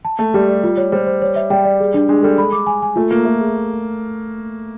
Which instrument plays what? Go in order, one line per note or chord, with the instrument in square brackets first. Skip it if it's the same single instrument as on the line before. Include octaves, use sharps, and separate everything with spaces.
[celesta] A5
[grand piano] A3 [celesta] A5
[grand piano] G3 [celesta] G4
[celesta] D5
F4
C#5
[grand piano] G3 [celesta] C5
[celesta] C5
C#5
E5
[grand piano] G3 [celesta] G5
[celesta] D5
G#4
D4
[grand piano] G#3 [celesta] D4
[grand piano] G3 [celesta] A4
[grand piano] G#3 [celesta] B5
[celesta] D6
G#5
G#5
[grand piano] A3 [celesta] F4
[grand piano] A#3 [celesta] F4
[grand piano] A3 [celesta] E5
[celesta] G#4